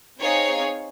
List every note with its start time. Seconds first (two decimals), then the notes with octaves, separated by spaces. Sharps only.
0.20 C4 D#4 G#4 C#5 F5